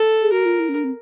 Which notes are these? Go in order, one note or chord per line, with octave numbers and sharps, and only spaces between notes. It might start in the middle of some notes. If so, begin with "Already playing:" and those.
Already playing: A4
G#4
F#4 A#4
F4
E4
C#4
D4
C4